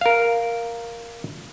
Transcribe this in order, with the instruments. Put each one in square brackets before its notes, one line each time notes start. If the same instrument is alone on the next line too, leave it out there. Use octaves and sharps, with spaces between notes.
[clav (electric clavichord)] A#4 F5